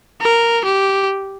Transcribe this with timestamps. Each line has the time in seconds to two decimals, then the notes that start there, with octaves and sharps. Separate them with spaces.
0.21 A#4
0.65 G4